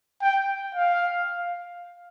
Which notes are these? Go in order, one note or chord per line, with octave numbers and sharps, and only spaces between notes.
G5
F5